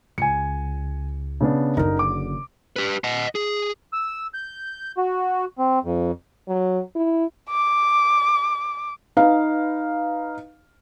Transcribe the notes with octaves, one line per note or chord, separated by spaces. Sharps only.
C#2 G#5 C#7
C#3 B3 D4
F#1 D3 D#4 A#4
D6
G4 B4
D#5 F#5
G#4
E6
G6
F#4
C4
F2
F#3
E4
D6
D#4 B4 F5